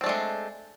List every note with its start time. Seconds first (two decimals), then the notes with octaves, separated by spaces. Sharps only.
0.01 C4
0.04 D4
0.06 A3
0.09 G#3